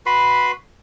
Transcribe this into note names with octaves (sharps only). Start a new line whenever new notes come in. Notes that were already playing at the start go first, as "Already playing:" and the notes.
F#4 B4 B5 C6